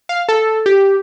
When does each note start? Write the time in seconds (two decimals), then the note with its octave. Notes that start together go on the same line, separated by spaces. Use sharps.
0.09 F5
0.29 A4
0.66 G4